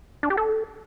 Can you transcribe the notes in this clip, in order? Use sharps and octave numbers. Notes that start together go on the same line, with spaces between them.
D4
G4
A4